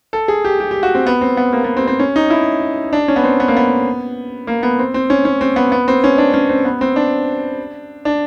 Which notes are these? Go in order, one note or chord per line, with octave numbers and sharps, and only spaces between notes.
A4
G#4
G4
G4
G4
F#4
C4
B3
C4
B3
A#3
B3
C4
C4
C#4
D#4
E4
D4
C#4
B3
C4
B3
A#3
B3
A#3
B3
C4
C4
C#4
C#4
C4
B3
B3
C4
C#4
D4
C#4
C4
B3
C4
D4
D4